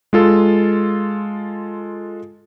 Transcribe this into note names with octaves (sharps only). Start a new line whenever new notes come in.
G#3 F4 A4